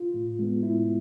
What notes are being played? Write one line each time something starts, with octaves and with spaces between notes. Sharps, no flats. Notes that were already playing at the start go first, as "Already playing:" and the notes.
Already playing: F4
A2
G#3 B3
A2 E4